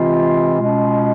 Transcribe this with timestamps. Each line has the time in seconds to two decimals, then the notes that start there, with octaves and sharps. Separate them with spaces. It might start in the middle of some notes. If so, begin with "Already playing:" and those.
Already playing: C3 E3 G#3 C4 F4
0.59 B2 G#3 C#4 F4